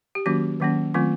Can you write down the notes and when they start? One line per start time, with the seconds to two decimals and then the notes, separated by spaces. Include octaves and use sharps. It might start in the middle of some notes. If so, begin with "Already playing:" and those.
0.15 G4
0.26 D#3 F#3 A#3 C#4 F#4
0.60 D#3 F#3 A#3 C#4
0.94 D#3 F#3 A3 C4 F4